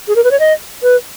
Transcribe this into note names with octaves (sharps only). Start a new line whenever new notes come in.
G#4
A#4
B4
C#5
D#5
B4